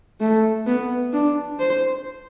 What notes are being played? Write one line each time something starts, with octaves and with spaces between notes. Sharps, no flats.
A3
B3
D4
C5